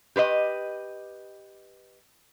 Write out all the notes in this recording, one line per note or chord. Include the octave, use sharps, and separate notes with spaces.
G4 B4 C5 D#5